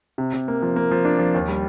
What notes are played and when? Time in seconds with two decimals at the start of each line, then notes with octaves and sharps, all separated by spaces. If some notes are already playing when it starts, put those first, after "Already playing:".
0.18 C3
0.34 C3
0.48 A#3
0.62 F3
0.76 A#3
0.91 F3
1.05 D4
1.19 F3
1.35 D#2
1.48 G3